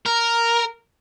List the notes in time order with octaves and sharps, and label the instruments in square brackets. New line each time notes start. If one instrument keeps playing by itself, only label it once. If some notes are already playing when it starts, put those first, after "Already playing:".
[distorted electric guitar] A#4